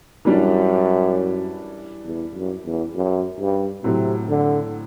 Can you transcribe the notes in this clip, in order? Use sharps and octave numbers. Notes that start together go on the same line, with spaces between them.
F#2 E3 G3 D4
E2
F#2
E2
F#2
G2
A2 C3 F#3 C4
D3